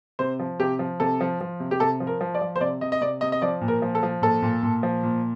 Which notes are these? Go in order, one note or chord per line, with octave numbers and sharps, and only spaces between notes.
C3 C5
F3
C3 G4
F3
C3 A4
F3
F3
C3
G4
C3 A4
F3
A#4
F3
D5
F3
C5
C3 D5
C3 D#5
D#5
C3 D5
C3 D#5
D#5
F3 D5
A#2
A#4
F3
A4
F3
A#2 A4
A#2
A#2
F3
A#2